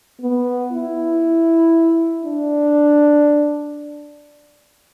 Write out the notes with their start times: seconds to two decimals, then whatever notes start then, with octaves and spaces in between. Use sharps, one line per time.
0.21 B3
0.72 E4
2.23 D4